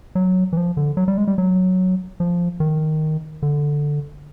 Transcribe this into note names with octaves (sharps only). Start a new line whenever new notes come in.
F#3
E3
F3
D3
F#3
G3
G#3
G3
F#3
F3
D#3
D3